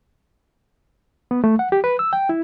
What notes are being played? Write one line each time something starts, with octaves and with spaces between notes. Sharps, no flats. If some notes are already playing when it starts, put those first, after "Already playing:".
B3
A3
F#5
G4
B4
E6
G5
E4